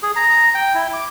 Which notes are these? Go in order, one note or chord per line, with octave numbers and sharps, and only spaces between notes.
G#4
A#5
G5
E4
D6